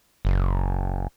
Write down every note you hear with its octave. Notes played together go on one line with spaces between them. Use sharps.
F#1